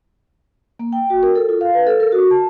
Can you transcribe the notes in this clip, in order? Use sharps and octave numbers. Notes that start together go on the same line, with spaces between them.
A#3
G5
F#4
A#4
A4
F4
F5
B4
A4
A#4
F#4
A5